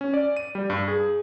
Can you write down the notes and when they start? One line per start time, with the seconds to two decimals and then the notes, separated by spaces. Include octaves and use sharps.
0.01 C#4
0.14 D5
0.37 D#7
0.55 G3
0.70 G2
0.88 G#4